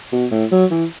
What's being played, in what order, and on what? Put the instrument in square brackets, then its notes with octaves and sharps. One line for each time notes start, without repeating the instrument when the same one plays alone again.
[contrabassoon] B2
A2
F#3
E3